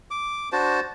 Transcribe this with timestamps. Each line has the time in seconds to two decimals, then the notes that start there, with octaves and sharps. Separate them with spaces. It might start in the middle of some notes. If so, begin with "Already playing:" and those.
0.11 D6
0.52 D4 F#4 C5 A5